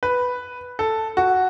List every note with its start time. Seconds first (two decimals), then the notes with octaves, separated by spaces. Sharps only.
0.03 B4
0.79 A4
1.17 F#4